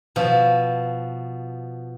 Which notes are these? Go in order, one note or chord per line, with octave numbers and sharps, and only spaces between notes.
B2 F3